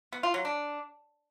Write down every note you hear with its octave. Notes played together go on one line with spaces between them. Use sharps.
B3
F4
F#3
D4